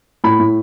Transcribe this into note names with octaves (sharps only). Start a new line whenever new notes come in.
A2 B5
A2